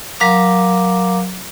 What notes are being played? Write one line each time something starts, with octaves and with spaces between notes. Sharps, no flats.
F#3 A#4 F5 A#5 D6